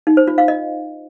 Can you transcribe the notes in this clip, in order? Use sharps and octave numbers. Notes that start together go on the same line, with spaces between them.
D#4
C5
F4
F5
D#5